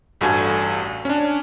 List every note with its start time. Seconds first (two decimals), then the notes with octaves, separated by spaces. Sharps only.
0.21 A1 G2 F#4 A4 G#5 G#6
1.05 C#4 D4